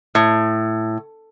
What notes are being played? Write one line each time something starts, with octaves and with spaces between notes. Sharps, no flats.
A2